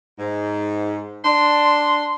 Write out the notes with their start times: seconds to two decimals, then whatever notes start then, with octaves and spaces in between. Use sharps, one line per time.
0.19 G#2
1.25 D4 C6